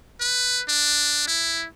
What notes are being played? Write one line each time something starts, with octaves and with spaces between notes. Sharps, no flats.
B4
D4
E4